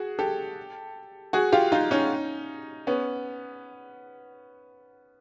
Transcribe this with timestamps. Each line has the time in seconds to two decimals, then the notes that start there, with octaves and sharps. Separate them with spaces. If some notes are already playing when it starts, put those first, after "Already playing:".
Already playing: F#4 G#4
0.19 G4 A4
1.33 F#4 G#4
1.52 F4 G4
1.72 D#4 F4
1.91 C#4 D#4
2.87 B3 C#4